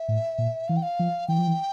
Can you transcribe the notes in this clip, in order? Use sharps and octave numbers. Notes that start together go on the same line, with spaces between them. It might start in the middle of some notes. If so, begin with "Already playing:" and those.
Already playing: E5
A2
A#2
E3 F5
G5
F5
F3
E3 G5
F3
E3